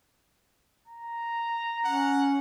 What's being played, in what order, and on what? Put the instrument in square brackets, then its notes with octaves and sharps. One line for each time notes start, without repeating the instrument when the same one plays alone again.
[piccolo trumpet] A#5
[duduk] C#4 [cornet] F#5